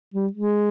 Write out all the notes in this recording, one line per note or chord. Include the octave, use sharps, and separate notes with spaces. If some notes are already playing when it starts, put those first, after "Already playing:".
G3
G#3